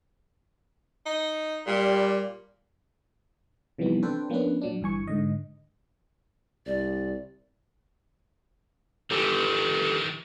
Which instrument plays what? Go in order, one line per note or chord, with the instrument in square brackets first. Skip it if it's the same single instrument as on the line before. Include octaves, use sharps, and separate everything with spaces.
[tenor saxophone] D#4
[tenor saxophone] A#2 [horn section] G3
[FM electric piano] C3 E3 F3 G3 B3 D#4
C4 D4 A4 B4 C5 G5
F3 A#3 B3 C#4 D4 B4
A#2 F#3 D4
G1 G2 E3 G#5 C#6
G#2 D3 D#5
[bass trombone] C2 [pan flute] D5
[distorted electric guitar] D#3 E3 [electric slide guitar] G4 A4